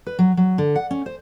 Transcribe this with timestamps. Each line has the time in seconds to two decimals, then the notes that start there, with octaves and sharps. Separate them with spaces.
0.06 B4
0.19 F#3
0.37 F#3
0.58 D3
0.75 F#5
0.91 C#4
1.06 C5